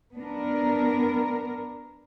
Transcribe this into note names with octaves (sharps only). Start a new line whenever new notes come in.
B3 D4 A#4